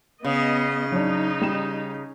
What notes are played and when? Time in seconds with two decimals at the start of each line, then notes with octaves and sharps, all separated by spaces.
0.24 C#3 B3 D#5
0.92 F#3 D4 D#4
1.41 G3 E7